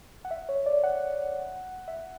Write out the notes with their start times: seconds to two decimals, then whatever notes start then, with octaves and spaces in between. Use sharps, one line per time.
0.25 F#5
0.31 E5
0.49 C#5
0.66 D5
0.83 F#5
1.88 E5